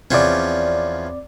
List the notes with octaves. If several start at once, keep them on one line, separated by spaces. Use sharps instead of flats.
E2 F3 C4 C#4 D5